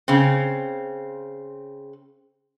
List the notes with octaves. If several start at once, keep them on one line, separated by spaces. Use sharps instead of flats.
C#3 C4